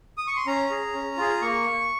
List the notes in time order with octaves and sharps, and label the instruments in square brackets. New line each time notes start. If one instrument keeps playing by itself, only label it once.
[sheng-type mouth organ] D#6
C#6
C6
C#4 A#5
G#4
C#4
F4 G#4
A#3 C#6